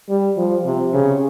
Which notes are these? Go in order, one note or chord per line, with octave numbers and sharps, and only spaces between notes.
G3
F3
C3
C#3